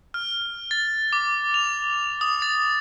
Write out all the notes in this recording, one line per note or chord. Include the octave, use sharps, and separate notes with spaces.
F6
A6
D6
F7
D#6
A6